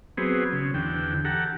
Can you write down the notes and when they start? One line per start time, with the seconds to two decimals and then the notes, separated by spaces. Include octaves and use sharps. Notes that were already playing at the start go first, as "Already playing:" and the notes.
0.17 F#3 B3 C4 G#4
0.53 C#3
0.74 E2 D3 G5
1.25 G4 A4 F#5 A#5